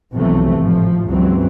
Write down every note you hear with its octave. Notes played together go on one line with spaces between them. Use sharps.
B1 F#2 C3 E3 F3 A3
G#1 A2 F3
C#2 G2 E3 F#3 C4